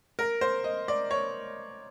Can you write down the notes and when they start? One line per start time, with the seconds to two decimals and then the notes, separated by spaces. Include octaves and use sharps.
0.19 A#4
0.41 C5
0.64 D#5
0.88 D5
1.11 C#5